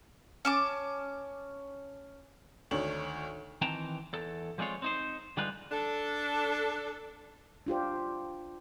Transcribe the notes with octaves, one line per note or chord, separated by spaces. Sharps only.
C#4 A5 D6
D2 D#3 D4 C#5 F#7
D#3 E3 C4 G5 A5 A#5
E2 A4
F3 G3 G#3 C4 F4 C#5
C4 D#4 C5
D3 G3 G#3 D#4 F4 B4
D4 A4
D4 F4 G4 C5